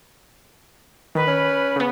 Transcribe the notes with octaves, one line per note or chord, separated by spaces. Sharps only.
D#3 B4
C#4
C#3 B3